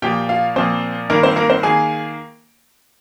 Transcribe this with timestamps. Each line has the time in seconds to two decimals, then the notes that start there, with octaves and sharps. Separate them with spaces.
0.02 A#2 F3 A#3 G4 G5
0.29 F4 F5
0.56 A#2 F3 A#3 C4 C5
1.10 G2 D#3 A#3 A#4
1.23 C4 C5
1.36 A#3 A#4
1.50 C4 C5
1.63 D#3 A#3 G#4 G#5